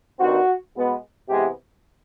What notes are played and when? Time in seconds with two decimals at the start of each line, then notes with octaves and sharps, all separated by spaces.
0.19 G2 D#3 G3 C4 F#4
0.74 B2 G#3 B3
1.29 C3 E3 G#3 B3 G4